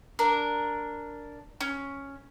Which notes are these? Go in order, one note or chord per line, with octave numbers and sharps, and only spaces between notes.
D4 A#4
C#4